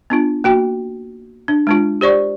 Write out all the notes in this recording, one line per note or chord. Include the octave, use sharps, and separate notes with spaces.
B3 D4 F4
A#3 F#4 G5
D4
G#3 D4 F4
G4 C5 D5 C#6